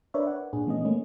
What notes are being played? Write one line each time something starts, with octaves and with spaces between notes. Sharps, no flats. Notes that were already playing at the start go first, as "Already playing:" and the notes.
D4 A#4 B4 C#5 D5 E5
F#5
A#2 D4 G#4
E3 A3 B3 C#4 D#5
A3 A#3 C#4